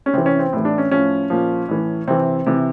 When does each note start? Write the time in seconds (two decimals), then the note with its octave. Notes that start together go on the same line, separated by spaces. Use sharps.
0.06 C#4
0.13 C3 E3 C4
0.26 C#4
0.39 C4
0.53 A2 E3
0.65 D4
0.78 C#4
0.91 A2 F3 C#4
1.30 A#2 F3
1.68 A2 E3
2.08 C3 E3 C4
2.46 C3 E3